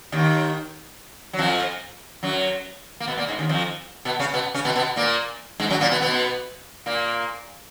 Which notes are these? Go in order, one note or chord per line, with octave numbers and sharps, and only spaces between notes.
D#2 D#3
F#3
F2 F3
F#2 F#3
A#3
B2 B3
A#2 A#3
G#2 G#3
D#2 D#3
F2 F3
B2 B3
C#3 C#4
B2 B3
C#3 C#4
B2 B3
B2 B3
A#2 A#3
G#2 G#3
F#2 F#3
A#2 A#3
B2 B3
B2 B3
A#2 A#3